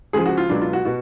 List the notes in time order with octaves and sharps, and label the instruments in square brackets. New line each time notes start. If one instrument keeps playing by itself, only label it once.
[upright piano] C#2 C#3 F3 G#4
F#4
F4
C#2 B2 F#3 D4
F4
F#4
B2 F#4